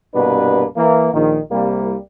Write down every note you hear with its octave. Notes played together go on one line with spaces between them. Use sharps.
C2 G2 B2 A#3 D4 B4
E3 A#3
A#1 D#3
C2 G3 A#3